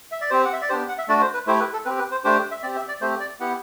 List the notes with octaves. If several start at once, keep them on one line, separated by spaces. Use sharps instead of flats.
E5
D5
C4 G4 C5
F#5
E5
D5
B3 D4 G4 C5
F#5
E5
A3 D4 F#4 D5
C5
B4
A3 E4 G4 C5
B4
A4
C4 G4 B4
B4
C5
A3 D4 G4 C5
E5
C4 G4 D5
E5
D5
A3 C4 G4 C5
D5
B3 E4 G4 F#5